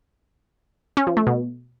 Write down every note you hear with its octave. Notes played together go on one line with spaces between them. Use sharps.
C#4
F3
A3
B2